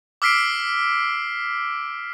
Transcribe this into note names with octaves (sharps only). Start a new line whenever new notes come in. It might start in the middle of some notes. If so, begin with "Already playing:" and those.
D6 E6 F6 B6 C7 D7